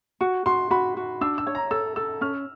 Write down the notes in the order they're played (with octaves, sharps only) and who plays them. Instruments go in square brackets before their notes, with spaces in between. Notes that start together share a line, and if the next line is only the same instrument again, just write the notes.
[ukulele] F#4 [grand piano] C#6
[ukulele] F#4 [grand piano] C6
[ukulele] F#4 [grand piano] B5
[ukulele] F#4
[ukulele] D4 [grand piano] E6
[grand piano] E6
[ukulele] C#5
[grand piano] A#5
[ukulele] A4 [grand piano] E6
[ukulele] A4 [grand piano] E6
[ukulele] C#4 [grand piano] F6